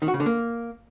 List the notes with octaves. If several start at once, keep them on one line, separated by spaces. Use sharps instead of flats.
D#3
F#4
C#3
D3
A#3